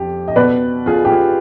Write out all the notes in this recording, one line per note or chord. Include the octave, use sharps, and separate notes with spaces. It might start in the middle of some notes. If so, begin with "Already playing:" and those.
Already playing: F2 G4
D#5
B2 B4 D5
F4 G#4
G4
F4 G#4